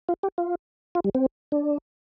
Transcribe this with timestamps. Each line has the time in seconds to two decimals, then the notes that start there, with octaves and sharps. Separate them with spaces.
0.09 F4
0.23 G4
0.38 F4
0.95 F4
1.04 G3
1.15 C4
1.52 D4